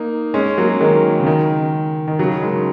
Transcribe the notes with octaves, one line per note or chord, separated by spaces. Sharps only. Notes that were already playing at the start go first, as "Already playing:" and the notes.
Already playing: A#3 D#4
G#3 C#4
F#3 A#3
A#3
D#3 G#3
C#3
D#3
D#3
C#3 F#3
D#3 G#3